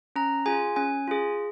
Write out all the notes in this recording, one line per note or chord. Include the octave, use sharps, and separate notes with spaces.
C#4 A#5
F4 G#4 G#5
C#4 G#5
F4 G#4